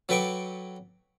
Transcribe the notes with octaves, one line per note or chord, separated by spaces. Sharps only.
F#3 A4 B4 G5 C#6 D6